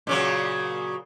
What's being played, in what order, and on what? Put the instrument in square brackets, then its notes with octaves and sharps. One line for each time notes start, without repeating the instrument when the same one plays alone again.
[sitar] A#2 C#3 F#3